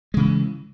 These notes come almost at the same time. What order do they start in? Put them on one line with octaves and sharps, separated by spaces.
G#3 C#3 E3